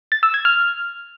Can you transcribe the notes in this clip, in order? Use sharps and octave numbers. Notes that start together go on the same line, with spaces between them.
A6
E6
G#6
F6